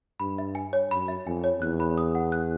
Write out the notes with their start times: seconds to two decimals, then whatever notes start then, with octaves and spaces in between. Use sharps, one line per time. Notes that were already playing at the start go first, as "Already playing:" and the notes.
0.20 G2 B5
0.38 E5
0.55 G#5
0.73 C#5
0.90 F#2 B5
1.08 E5
1.27 F2 G#5
1.44 C#5
1.61 E2 F#6
1.80 B5
1.98 D#6
2.15 F#5
2.32 F#6